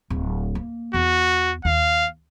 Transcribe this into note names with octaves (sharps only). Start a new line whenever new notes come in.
D1
A#3
E2 F#4
D#2 F5